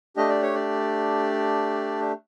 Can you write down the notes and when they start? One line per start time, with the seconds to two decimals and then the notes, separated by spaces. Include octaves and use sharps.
0.16 A3 D4 G4 D#5
0.29 D5
0.42 C#5
0.55 D5